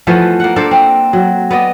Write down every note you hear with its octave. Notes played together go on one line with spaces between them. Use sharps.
E3 F3 A3 B3
A#3 F#5
A#3 D4 A4 C5
C4
F#3
B3 D5 D#5